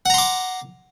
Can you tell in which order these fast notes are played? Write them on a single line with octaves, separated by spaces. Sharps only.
F#5 A#5 C6 D6